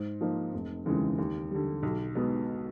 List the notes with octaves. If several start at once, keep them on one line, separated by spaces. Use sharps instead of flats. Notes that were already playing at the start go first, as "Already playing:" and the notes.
Already playing: G#2
F3 A#3 D#4
F1
D#2 C#3 E3 G#3
D#2
D3 G3
B1
B2 G#3 B3 D#4